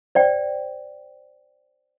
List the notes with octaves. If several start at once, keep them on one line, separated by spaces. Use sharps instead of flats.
C5 D5 G5